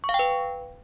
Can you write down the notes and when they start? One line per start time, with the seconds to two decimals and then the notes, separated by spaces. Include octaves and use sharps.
0.04 C#6
0.09 F5
0.14 G5
0.19 B4